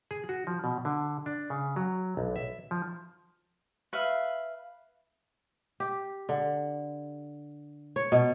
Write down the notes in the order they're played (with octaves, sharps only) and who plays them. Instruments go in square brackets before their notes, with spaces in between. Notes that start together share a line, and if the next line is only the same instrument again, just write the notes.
[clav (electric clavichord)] G#4
F#4
F3
B2
D3
D4
C#3
F#3
B1
E5
F3
[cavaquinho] B4 E5 F5
[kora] G4
D3
C#5
B2